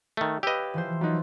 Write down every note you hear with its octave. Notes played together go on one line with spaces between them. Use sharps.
D#3 A3
G4 B4 C#5 D#5 F5 E6
E3 F3 C5
F#3 D#4 F4 B4